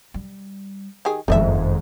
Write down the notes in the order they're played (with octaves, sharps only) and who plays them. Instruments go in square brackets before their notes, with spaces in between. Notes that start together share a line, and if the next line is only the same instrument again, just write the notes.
[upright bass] G3
[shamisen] D#3 G4 G#4
[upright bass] F#1 D#3 [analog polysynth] F2 G#2 [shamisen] A3 D#5 E5